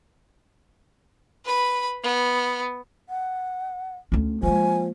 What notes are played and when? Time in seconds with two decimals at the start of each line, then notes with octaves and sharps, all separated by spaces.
1.45 B4 B5
2.03 B3
3.09 F#5
4.12 D2 C#4
4.43 F3 G#3 A#3 G#5